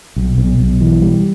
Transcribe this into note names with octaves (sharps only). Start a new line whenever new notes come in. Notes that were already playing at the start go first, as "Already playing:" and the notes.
B1
B1
B1
E3
G3